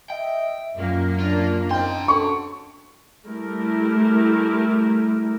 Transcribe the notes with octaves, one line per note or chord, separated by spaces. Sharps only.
D#5 E5 G5
F#2 A#2 A#3
D4 F4
C4 D4 D#4 G5 C6
C#4 F#4 A4 C#6
G3 A3 E4 G4 A#4